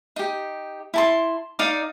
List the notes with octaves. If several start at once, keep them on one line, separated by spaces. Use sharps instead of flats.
D#4 G4
E4 A5 C6
D#4 D5 F5 D6